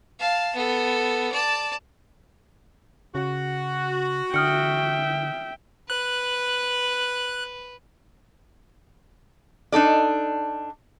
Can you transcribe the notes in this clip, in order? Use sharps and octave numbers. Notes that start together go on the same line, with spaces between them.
F5 A5
B3 A4
D5 A5
C#3 F#4
D3 E5 G5 D#6 F6 C#7
B4 F#6
D4 D#4 A4 D5